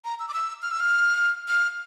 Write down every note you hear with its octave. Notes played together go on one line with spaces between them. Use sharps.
A#5
E6
D6
E6
F6
E6
F6
F6